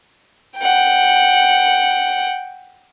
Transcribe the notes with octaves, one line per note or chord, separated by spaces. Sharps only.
F#5 G5